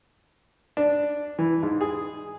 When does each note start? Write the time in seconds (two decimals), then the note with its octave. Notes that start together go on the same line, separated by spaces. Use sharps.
0.77 D4
1.39 E3
1.63 G#2
1.81 G#4